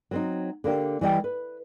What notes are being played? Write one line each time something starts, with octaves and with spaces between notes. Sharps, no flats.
F#3 C4 D#4
D3 A#3 D4 G4
E3 G3 D#5 G5
B4